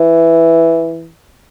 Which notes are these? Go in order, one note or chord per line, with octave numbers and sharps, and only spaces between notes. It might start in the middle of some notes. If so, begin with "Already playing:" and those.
Already playing: E3